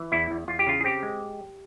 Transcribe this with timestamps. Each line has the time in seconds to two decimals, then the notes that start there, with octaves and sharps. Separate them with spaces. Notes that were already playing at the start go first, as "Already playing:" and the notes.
Already playing: E3
0.12 E2 E4
0.31 E2
0.48 E2 F4
0.59 G4
0.67 C#3 F4
0.81 G#4
0.84 C4 G4
1.03 G#3